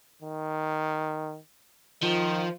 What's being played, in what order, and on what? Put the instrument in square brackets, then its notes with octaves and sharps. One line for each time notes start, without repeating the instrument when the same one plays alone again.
[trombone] D#3
[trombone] D#3 [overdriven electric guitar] F3